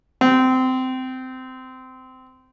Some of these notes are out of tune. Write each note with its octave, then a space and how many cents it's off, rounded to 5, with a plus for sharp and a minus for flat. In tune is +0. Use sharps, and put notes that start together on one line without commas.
C4 -20